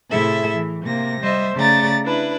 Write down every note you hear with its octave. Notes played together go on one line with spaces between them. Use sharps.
A2 C3 E4 G#4 A4 E5
E3
C3 A#3 A#6
G3 C5 D#5 E5
C#3 A3 D5 A#5 A6
D4 E4 B4